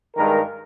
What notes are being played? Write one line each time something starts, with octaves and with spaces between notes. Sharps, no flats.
G2 D#3 G#3 A#4